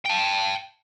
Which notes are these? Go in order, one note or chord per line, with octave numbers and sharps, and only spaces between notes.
G5 A5